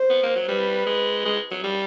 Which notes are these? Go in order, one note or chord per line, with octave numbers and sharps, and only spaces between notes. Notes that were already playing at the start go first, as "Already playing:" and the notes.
Already playing: C5
B3
A#3
F#3
G3 B4
G#3
G#3
F#3
G3